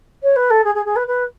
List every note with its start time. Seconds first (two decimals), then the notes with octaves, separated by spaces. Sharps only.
0.23 C#5
0.36 B4
0.50 A4
0.64 G#4
0.75 G#4
0.85 G#4
0.96 B4
1.07 B4